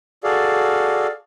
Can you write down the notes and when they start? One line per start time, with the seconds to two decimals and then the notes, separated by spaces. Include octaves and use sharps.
0.24 F#4 G#4 A4 D5 F5